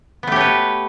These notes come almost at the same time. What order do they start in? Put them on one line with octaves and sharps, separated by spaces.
B3 A3 G4 C#5 B4